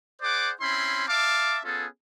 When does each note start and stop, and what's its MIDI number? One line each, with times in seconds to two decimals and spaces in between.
0.22 0.52 68
0.22 0.52 72
0.22 0.52 74
0.22 0.52 78
0.22 0.52 86
0.61 1.04 60
0.61 1.04 61
0.61 1.04 64
0.61 1.04 83
0.61 1.04 84
1.09 1.59 76
1.09 1.59 77
1.09 1.59 81
1.09 1.59 86
1.65 1.87 59
1.65 1.87 61
1.65 1.87 65
1.65 1.87 68
1.65 1.87 69